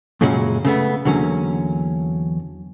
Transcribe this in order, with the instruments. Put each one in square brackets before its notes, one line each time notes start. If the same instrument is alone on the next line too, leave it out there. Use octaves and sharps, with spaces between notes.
[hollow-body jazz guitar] F#2 A#2 C#3 F#3 G#3 C#4
C#3 A3 B3
E2 D3 F#3 A#3 C#4